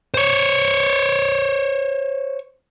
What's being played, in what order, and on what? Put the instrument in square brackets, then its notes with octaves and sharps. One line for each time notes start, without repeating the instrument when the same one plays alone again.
[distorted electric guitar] C5 C#5